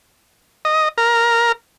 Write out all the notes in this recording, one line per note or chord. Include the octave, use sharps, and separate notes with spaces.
D#5
A#4